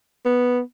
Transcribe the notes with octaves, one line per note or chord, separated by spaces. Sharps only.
B3